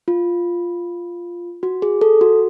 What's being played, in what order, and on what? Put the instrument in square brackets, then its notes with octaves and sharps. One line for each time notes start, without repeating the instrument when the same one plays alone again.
[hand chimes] F4
F#4
G#4
A4
F#4